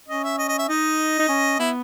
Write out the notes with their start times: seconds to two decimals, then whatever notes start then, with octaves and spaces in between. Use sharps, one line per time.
0.08 C#4 D#5
0.24 E5
0.39 D#5
0.49 D#5
0.59 E5
0.69 D#4 D#5
1.19 D#4
1.29 C#4
1.59 B3 E4